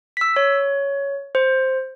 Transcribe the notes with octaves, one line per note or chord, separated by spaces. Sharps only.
E6 B6
C#5
C5